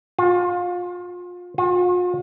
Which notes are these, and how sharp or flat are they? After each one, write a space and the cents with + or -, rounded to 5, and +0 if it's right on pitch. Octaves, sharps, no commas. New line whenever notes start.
F4 +30
F4 +45